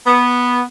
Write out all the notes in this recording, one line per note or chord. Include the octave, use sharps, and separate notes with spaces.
B3